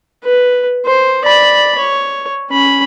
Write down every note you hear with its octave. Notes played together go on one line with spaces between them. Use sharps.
B4
C5
D5 B5
C#5
C#4 B5